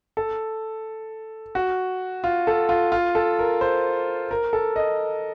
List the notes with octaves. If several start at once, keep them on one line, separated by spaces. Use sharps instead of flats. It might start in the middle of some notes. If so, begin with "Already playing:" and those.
A4
F#4
F4
A4
F4
F4
A4
A#4
C5
A#4
A4
D#5